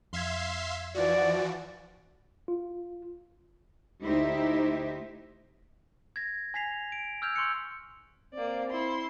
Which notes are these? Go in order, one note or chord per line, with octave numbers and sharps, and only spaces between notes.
F2 E5 F5 C6 G#6
E3 F3 F#4 D5
F4
D2 D#4 E4 G4 C5 E5
G#6 A#6
G#5 G#6 B6 C7 F7
D7
E6 F6 G6 G#6 F7
C6 C#6 E6 F#6 G6 C#7
A#3 C4 D5
E4 C6